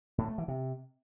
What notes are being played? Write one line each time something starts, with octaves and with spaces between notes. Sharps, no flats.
A2
A3
E3
C3